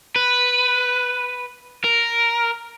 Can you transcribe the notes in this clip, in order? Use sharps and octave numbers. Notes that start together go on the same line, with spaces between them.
B4
A#4